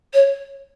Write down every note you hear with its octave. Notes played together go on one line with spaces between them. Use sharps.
C#5